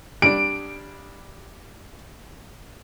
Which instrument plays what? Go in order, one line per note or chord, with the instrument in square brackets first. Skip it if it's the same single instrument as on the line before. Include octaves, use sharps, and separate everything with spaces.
[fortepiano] G3 D4 [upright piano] D7